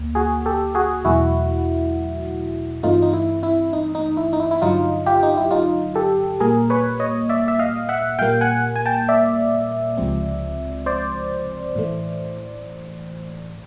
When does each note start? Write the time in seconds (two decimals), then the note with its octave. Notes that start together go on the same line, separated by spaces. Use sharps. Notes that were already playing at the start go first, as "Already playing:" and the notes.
Already playing: D2 A#3
0.15 F#4 G#4
0.46 G4 A4
0.75 F#4 G#4
1.05 E2 B2 F#3 A3 E4 F#4
2.83 G2 E3 A3 C4 D#4 F4
3.02 D#4
3.13 E4
3.43 E4
3.73 D#4
3.95 D#4
4.17 E4
4.33 D#4
4.40 E4
4.51 E4
4.62 G2 D3 F#3 D#4 F4
5.06 F4 G4
5.23 D#4
5.37 E4
5.51 D#4 F4
5.95 G4 A4
6.40 A#2 G3 A#3 G#4 A#4
6.70 B4 C#5
7.00 C#5 D#5
7.29 D5 E5
7.48 E5
7.59 D#5 F5
7.89 E5 F#5
8.19 A#2 G3 A#3 F5 G5
8.41 F#5 G#5
8.76 G#5
8.86 G5 A5
9.09 D5 E5
9.97 C#2 C3 F3 G#3 C4
10.86 C5 D5
11.76 A2 E3 A3